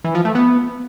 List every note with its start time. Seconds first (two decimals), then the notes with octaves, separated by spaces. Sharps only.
0.04 E3
0.15 F3
0.25 A3
0.35 B3